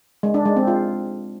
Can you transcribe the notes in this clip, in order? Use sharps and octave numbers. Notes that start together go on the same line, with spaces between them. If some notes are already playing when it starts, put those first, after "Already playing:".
G#3
D4
G#3
C4
F4